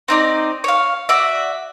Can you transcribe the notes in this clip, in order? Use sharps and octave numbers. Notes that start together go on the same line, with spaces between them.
C4 D#4 D5
C#5 F5
F#4 D5 E5